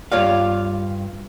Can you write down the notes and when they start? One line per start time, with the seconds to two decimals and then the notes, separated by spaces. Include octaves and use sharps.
0.12 G2 F4 C#5 D5 F5